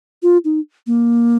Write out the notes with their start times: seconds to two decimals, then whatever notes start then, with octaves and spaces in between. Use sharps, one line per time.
0.23 F4
0.45 D#4
0.87 A#3